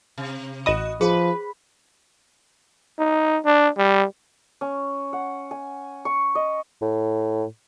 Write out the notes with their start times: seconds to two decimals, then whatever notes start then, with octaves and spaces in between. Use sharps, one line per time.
0.18 C3
0.66 A1 F#4 D#5 B5 D#6
1.01 F3 G#4 B4
2.99 D#4
3.45 D4
3.77 G3
4.61 C#4
5.13 F#5
5.51 G#5
6.05 C#6
6.35 D#5
6.82 A2